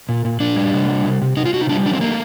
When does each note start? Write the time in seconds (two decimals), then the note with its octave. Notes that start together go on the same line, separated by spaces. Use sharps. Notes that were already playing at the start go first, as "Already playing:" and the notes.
0.09 A#2
0.25 A#2
0.40 A#2 D4
0.56 G3
0.74 C3
0.90 G3
1.05 C3
1.22 C3
1.37 C3 D#4
1.45 F4
1.53 C3 F#4
1.61 D#4
1.69 G3 D4
1.86 D#3 D4
1.93 C4
2.01 A3 A#3